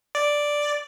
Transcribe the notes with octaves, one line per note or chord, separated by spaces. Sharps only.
D5